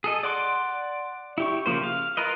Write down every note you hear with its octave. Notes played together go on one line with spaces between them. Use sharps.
G#4 A4 D#5
D5 F#5 C6 D6
E4 G4 C#6
C#3 F3 A#3 C5
F5
F4 A#4 B4 D#5